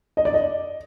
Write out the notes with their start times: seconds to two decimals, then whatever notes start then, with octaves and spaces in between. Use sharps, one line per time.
0.17 D#5
0.25 D5
0.34 D#5